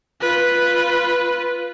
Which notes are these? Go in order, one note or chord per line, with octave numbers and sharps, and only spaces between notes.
F4 B4